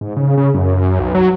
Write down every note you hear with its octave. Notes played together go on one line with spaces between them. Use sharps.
G#2
C#3
C#3
F#2
B1
F#3